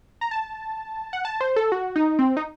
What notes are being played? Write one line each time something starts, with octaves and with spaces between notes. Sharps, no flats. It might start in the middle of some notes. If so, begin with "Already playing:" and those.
A#5
A5
F#5
A5
C5
A4
F#4
D#4
C4
D#4